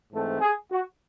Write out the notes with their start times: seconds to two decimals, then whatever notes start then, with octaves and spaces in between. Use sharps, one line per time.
0.12 G#2 E3 A3 C4 A4
0.41 G#4
0.71 F#4